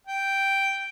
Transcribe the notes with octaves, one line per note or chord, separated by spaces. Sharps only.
G5